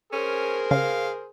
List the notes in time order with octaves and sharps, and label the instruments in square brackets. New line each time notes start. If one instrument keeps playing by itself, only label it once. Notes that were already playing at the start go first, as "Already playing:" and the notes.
[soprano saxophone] C#4 [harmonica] G#4 A#4 C5
[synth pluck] C#3 [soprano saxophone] F5